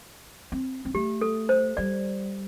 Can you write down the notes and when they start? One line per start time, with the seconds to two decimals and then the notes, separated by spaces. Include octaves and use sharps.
0.52 C4
0.85 C4
0.94 A3 G4
1.21 A4
1.49 C5
1.77 G3 D5